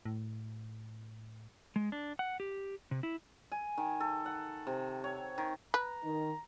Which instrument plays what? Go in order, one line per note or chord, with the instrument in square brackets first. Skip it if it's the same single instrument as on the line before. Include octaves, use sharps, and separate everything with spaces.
[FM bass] A2
[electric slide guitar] G#3
D4
F#5
G4
C3
E4
[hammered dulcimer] G#5
D#3
A4
F#5
C3
C#5
D#3
[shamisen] B4 [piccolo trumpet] A#5
[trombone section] D#3